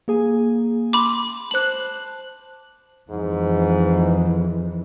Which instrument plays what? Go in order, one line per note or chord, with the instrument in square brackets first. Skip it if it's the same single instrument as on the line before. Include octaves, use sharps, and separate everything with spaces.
[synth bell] A#3 G#4 G#5
[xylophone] B5 D6 [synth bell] C6
[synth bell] C5 A5 [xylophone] F#6 F#7
[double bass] F2 E3 [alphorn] G#2